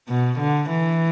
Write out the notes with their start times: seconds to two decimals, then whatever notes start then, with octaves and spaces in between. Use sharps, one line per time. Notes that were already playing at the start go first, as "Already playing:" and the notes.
0.09 B2
0.40 D3
0.70 E3